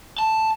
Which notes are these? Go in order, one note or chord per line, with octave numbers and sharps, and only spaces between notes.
A5